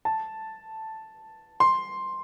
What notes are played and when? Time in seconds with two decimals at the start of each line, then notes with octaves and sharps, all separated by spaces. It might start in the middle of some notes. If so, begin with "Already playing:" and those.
0.05 A5
1.60 C6